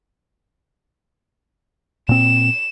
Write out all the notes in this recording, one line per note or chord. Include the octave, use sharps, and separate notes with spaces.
A#2 C4 E7